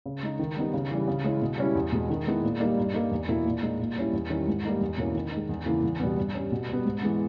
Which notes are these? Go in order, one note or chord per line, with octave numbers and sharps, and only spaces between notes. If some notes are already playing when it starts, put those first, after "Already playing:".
C#3
G#3 D#4
D#3
G3 B3 D#4
C#3
E3 G3
C#3
G#3 C#4 E4
B2
G3 C#4 E4
E2
B2 G#3
D#3
G#3 B3 E4
A#2
G3 A#3 D#4
G2
G3 A#3 D#4
E2
B2 A#3 E4
A#2
G#3 D#4
A#2
G3 C#4 E4
E2
D#3 G3 C#4 E4
G#2
G3 A#3 D#4
E2
B2 A#3 C#4 E4
D#3
G#3 D#4
E2
C#3 E3 A#3 E4
E2
B2 G3 B3
G2
G3 C#4
B2
G3 B3
G#2
E3 G#3 B3